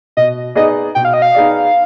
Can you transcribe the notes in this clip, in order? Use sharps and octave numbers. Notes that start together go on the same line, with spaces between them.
B2 D#5
B3 D#4 G#4 D5 D#5
B2 G5
F5
D#5
F5
B3 D#4 G#4 D5